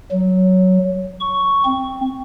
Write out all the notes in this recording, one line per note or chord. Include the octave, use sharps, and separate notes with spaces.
F#3
C#6
C4